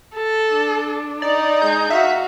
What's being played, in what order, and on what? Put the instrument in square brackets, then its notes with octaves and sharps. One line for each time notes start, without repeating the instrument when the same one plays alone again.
[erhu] A4
[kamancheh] D4
[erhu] D#4 [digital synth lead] D5
[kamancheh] G#3 [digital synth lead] G6
[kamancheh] F#4 F5 [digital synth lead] E5